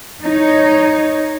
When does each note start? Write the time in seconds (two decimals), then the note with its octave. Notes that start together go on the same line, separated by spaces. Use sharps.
0.22 D#4 C#5